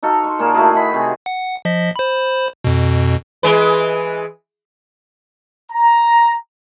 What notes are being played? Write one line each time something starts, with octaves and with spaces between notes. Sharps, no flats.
D#4 F#4 A4 F5
C6 C#6
A#2 A#3 G#4 A5
A3 E4 F#4 G#4
D#3 B5
C3 C4 G#5
F#5
F3 D#5 B6
C5 B5
F2 B2
E3 G#3 B4
A#5